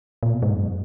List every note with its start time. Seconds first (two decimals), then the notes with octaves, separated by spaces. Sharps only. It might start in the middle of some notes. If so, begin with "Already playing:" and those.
0.23 A#2
0.32 B2
0.43 G#2
0.54 F#2